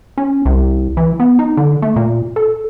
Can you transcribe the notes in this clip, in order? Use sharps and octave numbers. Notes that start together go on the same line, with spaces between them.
C#4
C2
E3
B3
D#4
D3
A3
A#2
A4